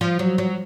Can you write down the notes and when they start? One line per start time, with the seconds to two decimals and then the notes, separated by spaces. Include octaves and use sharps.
0.01 F3
0.19 F#3
0.38 F#3